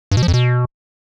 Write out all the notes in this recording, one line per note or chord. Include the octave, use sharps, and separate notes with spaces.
G2
B2
F3
F2
B2